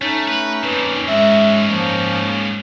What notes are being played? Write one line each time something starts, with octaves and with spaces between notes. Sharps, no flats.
A3 C#4 D#4
A3 B4
F2 A#2 B4
G#2 G#3 F#4 E5
F3 A#3